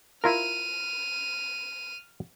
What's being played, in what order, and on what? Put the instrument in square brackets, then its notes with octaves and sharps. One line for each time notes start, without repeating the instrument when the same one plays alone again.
[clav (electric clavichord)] E4 F4 A#4 [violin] F6 D#7